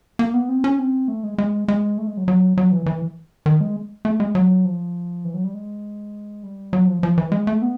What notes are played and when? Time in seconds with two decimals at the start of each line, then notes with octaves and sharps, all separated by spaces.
0.19 A#3
0.34 B3
0.49 C4
0.64 C#4
0.79 C4
1.08 A3
1.23 G#3
1.38 G#3
1.68 G#3
1.98 A3
2.07 G#3
2.17 F#3
2.28 F#3
2.58 F#3
2.72 E3
2.86 E3
3.46 D#3
3.61 G#3
4.05 A3
4.20 G#3
4.35 F#3
4.65 F3
5.25 E3
5.34 F#3
5.44 G3
5.54 G#3
6.43 G3
6.73 F#3
6.88 F3
7.03 F3
7.18 E3
7.32 G#3
7.47 A3
7.62 B3